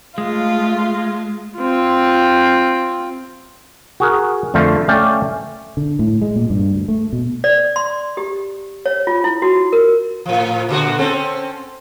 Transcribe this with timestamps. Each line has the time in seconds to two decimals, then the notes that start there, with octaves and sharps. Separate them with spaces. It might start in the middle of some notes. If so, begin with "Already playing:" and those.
0.18 G#3 A3 F4 F5
1.57 C4 F4
4.00 F#4 G#4 A#4
4.54 F2 D3 A3 C5 F5
4.88 A3 C#4 D5 F5 G5
5.77 D3
5.99 A2
6.22 G#3
6.36 A#2
6.50 G2
6.75 D2
6.88 A3
7.13 B2
7.44 D5
7.76 C6
8.17 G4
8.86 C#5
9.07 F4
9.24 E4
9.42 F#4
9.73 A#4
10.26 A2 F3
10.69 A#2 D3 F#4
10.98 C4 C#4 A4